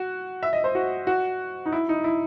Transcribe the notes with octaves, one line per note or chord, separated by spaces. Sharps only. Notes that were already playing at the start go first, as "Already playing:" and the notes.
Already playing: F#4
E5
D#5
C5
F#4
F#4
D#4
E4
D#4
E4